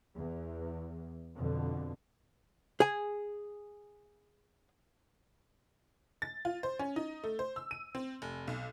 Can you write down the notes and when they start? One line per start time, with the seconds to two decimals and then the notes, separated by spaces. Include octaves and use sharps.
0.17 E2
1.35 F2 B2 D3
2.80 G#4 G#5
6.22 A6
6.45 F4
6.63 C5
6.79 C#4
6.96 D#4
7.24 A3
7.39 C5
7.56 E6
7.71 D#7
7.95 C4
8.22 F1
8.48 B1